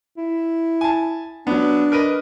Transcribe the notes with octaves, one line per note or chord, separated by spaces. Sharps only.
E4
G#5 A5
F#3 B3 D4
A#4 B4 D#5